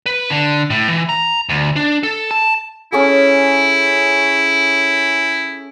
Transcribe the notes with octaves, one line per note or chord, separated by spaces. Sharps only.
B4
D3
A2
E3
A#5
D2
D4
A4
A5
C#4 E4 G#4 A4